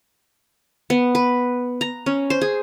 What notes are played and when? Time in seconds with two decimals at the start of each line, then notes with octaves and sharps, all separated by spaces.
0.90 B3
1.15 B4
1.81 A#5
2.06 C#4
2.30 C5
2.41 G#4